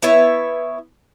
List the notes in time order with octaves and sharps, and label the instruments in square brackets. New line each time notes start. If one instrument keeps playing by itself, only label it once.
[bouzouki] B3 E4 B4 C#5